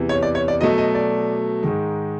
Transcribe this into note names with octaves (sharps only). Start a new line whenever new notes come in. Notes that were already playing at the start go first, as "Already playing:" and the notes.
Already playing: E2 C3 E3
C#5
D5
C#5
D5
B2 F#3 A3 D#5
D#5
D5
G#2 D#3 G#3